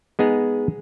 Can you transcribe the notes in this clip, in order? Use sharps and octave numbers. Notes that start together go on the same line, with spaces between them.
G#3 B3 D#4 G#4